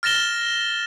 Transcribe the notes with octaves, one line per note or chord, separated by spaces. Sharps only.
F6 A6 A#6 E7 G7